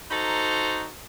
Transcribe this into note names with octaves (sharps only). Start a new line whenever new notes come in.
D#4 F#4 A4 C5 A#5